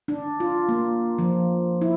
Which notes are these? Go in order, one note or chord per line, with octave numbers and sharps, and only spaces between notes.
D4
F4
A#3
F3
E4